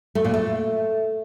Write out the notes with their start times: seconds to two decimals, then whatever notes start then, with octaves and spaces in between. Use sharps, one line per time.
0.15 A3
0.24 A#2
0.34 A3